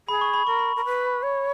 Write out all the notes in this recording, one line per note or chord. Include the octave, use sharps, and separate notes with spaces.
G#4 B5
C#6
B5
A#4 C#6
B5
A#4
B4
C#5